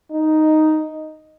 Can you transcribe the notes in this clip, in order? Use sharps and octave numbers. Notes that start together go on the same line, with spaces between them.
D#4